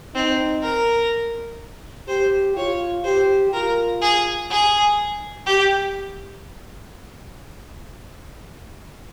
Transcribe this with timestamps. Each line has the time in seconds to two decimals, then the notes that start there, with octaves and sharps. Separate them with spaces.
0.15 C4 D#4
0.63 A#4
2.08 G4 C5
2.57 F4 C#5
3.04 G4 C5
3.53 F4 A#4
4.01 G#4
4.50 G#4
5.46 G4